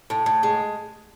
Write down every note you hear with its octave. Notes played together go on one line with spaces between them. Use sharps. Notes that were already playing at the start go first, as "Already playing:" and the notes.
A2
A2
G#3